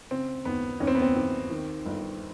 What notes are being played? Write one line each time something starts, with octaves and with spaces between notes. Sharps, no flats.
C#3 C4
D#2 B3
D#2 C#4
C4
B3
C4
D#2
D#3
G1